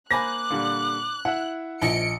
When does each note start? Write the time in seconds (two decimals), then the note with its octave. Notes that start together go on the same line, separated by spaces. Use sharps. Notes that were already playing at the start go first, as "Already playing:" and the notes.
0.11 A#3 C5 G#5 B5 D6 F#6 A#6
0.50 A#2 D3 G3
1.25 E4 E5 F#5
1.82 A#1 F3 D#5 C#7 D7